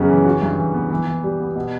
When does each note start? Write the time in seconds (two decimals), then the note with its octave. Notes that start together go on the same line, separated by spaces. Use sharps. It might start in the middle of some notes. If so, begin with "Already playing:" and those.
Already playing: F#2 C#3 B3
0.09 E3
0.25 F#4
0.42 G2
0.57 E3
0.74 B3
0.90 E3
1.06 E3
1.24 G3
1.40 B3
1.55 B2